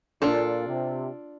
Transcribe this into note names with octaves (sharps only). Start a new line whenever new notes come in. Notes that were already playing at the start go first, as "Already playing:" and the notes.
A#2 D4 F4 A4
C3